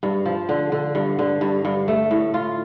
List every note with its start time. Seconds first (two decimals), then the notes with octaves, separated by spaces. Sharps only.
0.03 G2
0.26 F3
0.49 D3
0.72 D3
0.95 G2
1.19 D3
1.41 G2
1.65 G2
1.88 A3
2.11 A2
2.34 F4